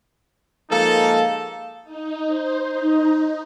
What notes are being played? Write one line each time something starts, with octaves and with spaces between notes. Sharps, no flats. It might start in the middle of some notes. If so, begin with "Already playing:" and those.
F3 G#3 A#3 D#4 A4 F5
D#4
C5
D#4